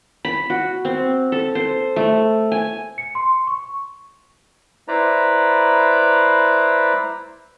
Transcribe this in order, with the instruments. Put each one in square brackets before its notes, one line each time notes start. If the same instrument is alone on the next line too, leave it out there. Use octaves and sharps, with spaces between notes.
[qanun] B5
F#4
C4
A4
C5
A3
G#5
[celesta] C#7
C6
C#6
[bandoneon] E4 B4 C5 D5 A#5 B5